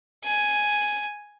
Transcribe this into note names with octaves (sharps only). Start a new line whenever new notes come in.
G#5